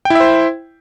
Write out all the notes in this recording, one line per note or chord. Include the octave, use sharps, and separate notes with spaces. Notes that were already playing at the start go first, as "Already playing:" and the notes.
E4 C5 E5 G5